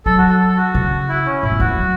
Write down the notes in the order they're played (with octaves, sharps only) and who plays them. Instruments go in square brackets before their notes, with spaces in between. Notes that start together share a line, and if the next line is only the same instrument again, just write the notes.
[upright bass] F#3 [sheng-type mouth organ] A4
[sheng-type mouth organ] F#4
A4
A4
F#4
[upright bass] C#3
[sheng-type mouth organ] E4
C#4
[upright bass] A2 [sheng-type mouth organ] E4
[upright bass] E2
[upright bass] E3 [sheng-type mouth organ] F#4
[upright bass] A3
F#3